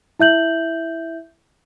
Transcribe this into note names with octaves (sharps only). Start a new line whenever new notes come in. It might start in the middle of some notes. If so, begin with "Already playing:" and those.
E4 E5 G6 F#7